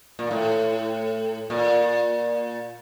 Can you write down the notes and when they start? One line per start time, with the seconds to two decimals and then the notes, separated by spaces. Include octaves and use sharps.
0.19 A#2
0.31 A2
1.50 A#2